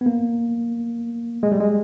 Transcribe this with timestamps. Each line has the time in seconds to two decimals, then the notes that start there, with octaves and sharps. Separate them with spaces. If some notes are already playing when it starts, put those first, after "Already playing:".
0.01 B3
0.06 A#3
1.43 G#3
1.52 G3
1.60 G#3